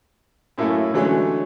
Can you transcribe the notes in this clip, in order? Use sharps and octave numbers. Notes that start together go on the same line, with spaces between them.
F#2 A2 A#3 E4 A4 G#5
D3 E3 F#3 G#3 A3 C#4